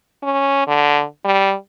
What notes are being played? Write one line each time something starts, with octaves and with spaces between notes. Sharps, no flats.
C#4
D3
G3